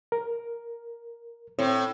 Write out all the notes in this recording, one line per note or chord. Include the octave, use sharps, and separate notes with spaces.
A#4
A2 C4